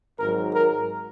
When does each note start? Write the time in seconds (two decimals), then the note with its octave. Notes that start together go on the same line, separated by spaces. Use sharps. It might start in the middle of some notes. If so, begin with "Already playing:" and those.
0.20 G#1 G#2 F#3 A#4
0.54 A#4